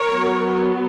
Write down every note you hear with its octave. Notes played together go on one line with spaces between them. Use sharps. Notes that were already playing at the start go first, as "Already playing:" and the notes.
Already playing: A#4 C#5
F#3 B3